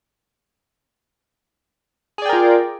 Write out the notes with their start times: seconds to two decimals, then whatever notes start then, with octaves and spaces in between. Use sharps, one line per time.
2.18 G#4
2.22 D5
2.26 G5
2.29 A#4
2.33 F4